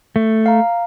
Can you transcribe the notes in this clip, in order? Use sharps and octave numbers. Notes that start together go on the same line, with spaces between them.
A3
F5 A#5